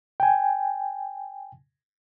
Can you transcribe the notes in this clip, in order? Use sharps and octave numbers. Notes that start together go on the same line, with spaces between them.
G5 G#5